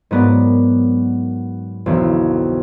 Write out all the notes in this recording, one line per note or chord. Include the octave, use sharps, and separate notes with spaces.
G#2 F#3 B3 A#4 D5
B1 F2 D3 E3